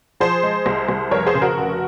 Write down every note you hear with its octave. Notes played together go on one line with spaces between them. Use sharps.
F3 G#4 C5
G#3
C2
C2
F1 A#4 C#5
G#4 C5
C#3
F#4 A#4
F1